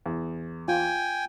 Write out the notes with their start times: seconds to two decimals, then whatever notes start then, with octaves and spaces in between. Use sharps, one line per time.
0.06 E2
0.68 F4 G5 G#5